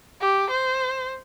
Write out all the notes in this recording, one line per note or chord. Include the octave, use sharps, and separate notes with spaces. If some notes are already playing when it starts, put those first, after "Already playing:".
G4
C5